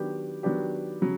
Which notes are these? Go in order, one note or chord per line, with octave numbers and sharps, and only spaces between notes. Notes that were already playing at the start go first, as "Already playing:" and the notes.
Already playing: D#3 F#3 B3 D4 G4
D#3 F#3 B3 D4 G4
C#3 F#3